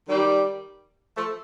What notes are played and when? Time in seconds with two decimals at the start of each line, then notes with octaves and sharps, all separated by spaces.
0.09 D#3 G3
1.18 F3 A3